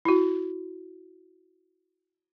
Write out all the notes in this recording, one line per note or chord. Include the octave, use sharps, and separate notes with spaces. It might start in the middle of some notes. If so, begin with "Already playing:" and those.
E4 F#4